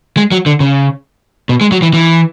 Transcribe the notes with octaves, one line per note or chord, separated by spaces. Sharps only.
G#3
F#3
D3
C#3
B2
G#3
F#3
E3
E3